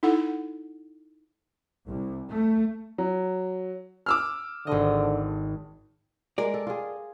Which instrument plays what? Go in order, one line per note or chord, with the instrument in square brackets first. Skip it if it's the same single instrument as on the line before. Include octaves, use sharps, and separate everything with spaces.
[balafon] D#4 E4 A4 F#5
[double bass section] C2
A3
[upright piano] F#3
D6 E6 F6
[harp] G#1 D#5 [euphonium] D3
[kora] G#3 [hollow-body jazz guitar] A#4 D5
[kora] A4
F4 G#4